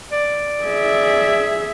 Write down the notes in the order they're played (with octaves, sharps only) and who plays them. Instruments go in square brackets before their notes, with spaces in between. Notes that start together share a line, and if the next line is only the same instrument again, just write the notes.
[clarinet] D5
[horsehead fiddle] G#4 E5